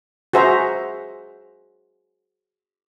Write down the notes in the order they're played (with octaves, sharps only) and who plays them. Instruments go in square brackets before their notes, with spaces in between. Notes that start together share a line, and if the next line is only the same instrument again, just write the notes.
[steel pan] F#4 G#4 C5 E5 A#5